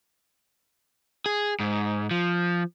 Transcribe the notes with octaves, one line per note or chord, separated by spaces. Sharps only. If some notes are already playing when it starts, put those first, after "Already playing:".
G#4
G#2
F3